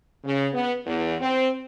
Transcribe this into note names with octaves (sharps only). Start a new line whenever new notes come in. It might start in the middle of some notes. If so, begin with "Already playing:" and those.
C#3
B3
E2
C4